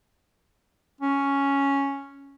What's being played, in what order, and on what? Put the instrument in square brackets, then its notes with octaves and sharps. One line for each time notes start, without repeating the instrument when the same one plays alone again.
[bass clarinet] C#4